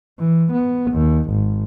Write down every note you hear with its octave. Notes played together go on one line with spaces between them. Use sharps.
E3
B3
D#2
G#1